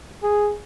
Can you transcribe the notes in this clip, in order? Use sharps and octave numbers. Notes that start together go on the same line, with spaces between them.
G#4